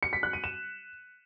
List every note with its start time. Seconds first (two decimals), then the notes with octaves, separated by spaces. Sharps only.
0.03 C#7
0.13 B6
0.23 F#6
0.33 D#7
0.44 E7